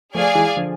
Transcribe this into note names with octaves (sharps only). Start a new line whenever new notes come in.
F3 A3 G#4 D5 F5 G#5
E3 G#3
D3 F3